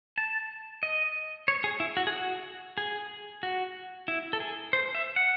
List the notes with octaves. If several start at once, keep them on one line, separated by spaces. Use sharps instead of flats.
A5
D#5
C#5
G#4
E4
F#4
G#4
F#4
G#4
F#4
E4
A4
G#4
C5
E5
F#5